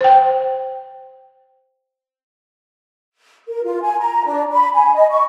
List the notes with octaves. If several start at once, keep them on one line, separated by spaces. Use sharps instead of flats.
C5 G5
A#4
F4
G#5
A#5
D4
B5
G#5
D#5
C#6